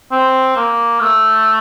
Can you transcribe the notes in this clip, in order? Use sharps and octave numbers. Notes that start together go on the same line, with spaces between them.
C4
A#3
A3